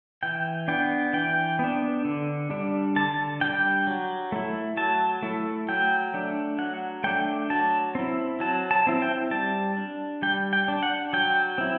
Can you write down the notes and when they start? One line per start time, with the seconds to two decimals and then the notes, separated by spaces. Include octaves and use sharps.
0.23 E3 G5
0.68 B3 D4 G5
1.13 E3 G5
1.59 B3 D4
2.05 D3
2.50 G3 D4
2.96 D3 A5
3.14 A5
3.41 G3 D4 G5
3.87 F#3
4.32 A3 E4
4.77 F#3 A5
5.23 A3 E4
5.69 F#3 G5
6.14 A3 D4
6.58 F#3 F#5
7.04 A3 D4 G5
7.50 F#3 A5
7.95 C4 E4
8.40 F#3 A5
8.71 A5
8.87 C4 E4
9.02 G5
9.31 G3 A5
9.77 D4
10.22 G3 G5
10.53 G5
10.68 D4
10.83 F#5
11.13 F#3 G5
11.58 C4 E4